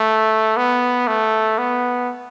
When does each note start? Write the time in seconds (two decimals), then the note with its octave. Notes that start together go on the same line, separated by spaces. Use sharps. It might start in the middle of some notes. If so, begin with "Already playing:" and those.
Already playing: A3
0.57 B3
1.07 A3
1.58 B3